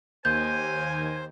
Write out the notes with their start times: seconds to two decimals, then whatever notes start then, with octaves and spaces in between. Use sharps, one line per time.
0.25 D#2 A#4 C5 G#5 G6